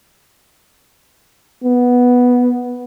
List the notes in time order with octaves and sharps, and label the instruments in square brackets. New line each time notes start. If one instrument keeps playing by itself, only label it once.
[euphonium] B3